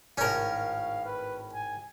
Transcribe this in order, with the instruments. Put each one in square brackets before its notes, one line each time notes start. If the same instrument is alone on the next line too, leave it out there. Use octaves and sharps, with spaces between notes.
[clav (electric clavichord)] G#1 A2 [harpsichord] C#4 A#4 [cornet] F5
[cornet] B4
G#5